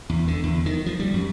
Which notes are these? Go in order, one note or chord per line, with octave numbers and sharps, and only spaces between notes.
E2
D3
E2
D#3
F3
G3
F#2